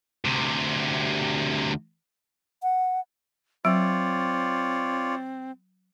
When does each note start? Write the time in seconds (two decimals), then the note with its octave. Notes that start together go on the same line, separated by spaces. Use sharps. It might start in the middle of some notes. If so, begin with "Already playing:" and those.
0.25 D2 C3
2.63 F#5
3.65 F#3 C4 F4 C#5 D5